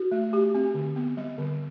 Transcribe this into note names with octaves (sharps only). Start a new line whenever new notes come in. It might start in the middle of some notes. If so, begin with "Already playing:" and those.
Already playing: F#4
A3
G4
C4
D3
B3
G3
D3